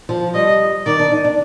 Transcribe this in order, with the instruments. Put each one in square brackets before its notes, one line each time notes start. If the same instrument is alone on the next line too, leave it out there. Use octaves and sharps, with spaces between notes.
[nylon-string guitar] F3
[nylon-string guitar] G3 [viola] D#5
[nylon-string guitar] D#3 [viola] D5
[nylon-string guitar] D4
D#4
D4